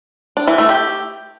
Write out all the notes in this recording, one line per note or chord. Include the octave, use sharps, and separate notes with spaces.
D4
E3
A3
G4